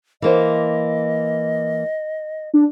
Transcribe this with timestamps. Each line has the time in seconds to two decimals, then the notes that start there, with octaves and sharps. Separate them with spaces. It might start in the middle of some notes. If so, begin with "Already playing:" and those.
0.22 E3 A#3 C5 D#5
2.54 D4